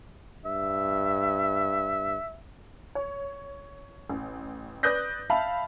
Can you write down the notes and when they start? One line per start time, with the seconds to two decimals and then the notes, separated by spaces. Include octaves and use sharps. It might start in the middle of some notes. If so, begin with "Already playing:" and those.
0.45 G2 E5
2.95 C#5
4.10 A1
4.83 B4 D5 D#6 F#6 G6 A#6
5.30 E5 F5 A5 B5